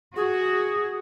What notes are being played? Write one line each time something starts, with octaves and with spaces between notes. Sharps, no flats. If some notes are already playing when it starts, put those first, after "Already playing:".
F#4 G#4